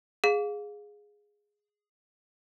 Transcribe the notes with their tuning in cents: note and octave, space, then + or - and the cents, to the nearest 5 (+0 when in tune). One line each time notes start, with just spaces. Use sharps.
G#4 +0 F5 +20